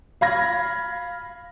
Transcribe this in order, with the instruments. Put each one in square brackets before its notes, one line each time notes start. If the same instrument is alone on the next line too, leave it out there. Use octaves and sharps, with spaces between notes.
[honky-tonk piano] F5 B5 G#6 A#6